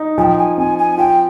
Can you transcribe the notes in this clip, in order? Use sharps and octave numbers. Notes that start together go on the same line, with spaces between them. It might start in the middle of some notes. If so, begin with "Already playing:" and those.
Already playing: D#4
F3 G5 G#5
G#5
C4 G#5
G#5
F4 G5